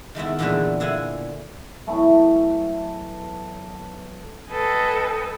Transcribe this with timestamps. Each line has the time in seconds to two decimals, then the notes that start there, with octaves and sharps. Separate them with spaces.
0.15 D#3 A3 B3 E4
0.39 E2 A#2 D3 E3 A3 B3
0.80 D3 E4 F5 G#5
1.87 E3 F#3 A3 B3
4.51 A4 B4 D#5 G5 G#5